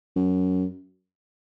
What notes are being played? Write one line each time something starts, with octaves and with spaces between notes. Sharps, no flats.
F#2